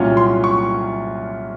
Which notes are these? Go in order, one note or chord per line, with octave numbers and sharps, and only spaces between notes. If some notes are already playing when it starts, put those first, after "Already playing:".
Already playing: C2 A#2 F#3 C#4 F4 C#5
C6
C#6